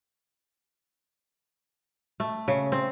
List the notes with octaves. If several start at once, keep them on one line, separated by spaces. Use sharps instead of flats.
A3
C#3
C4